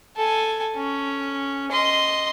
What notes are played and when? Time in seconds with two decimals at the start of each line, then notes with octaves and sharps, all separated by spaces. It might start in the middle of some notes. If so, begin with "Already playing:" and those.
0.16 A4 G#5
0.76 C#4
1.71 D#5 C6